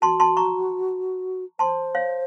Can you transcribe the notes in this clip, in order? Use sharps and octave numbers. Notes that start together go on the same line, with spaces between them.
F#4 A5 C6
A5 C6
A#5 C#6
C5 A5 C6
C#5 F5